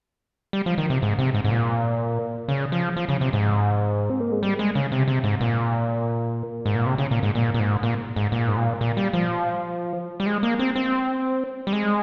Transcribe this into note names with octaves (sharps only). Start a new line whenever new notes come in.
G3
F3
D#3
C3
G#2
C3
G#2
G#2
A#2
C#3
F3
F3
C#3
C3
G#2
C4
A#3
G#3
G3
G#3
C#3
C3
C3
G#2
A#2
G#2
A#2
C3
C#3
A#2
G#2
A#2
A#2
G#2
A#2
G#2
A#2
G#2
A#2
A#2
G3
F3
G3
G#3
A#3
C4
C4
G3
G#3